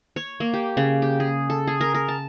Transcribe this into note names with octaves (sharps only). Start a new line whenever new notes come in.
C#5
A#3
G4
C#3
G4
G#4
A4
G#4
A#4
A#4
A5